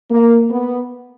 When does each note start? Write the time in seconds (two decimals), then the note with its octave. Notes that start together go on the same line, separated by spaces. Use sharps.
0.10 A#3
0.50 B3